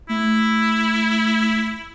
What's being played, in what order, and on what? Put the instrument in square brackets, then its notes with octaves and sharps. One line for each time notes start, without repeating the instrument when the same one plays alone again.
[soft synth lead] A3 [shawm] E4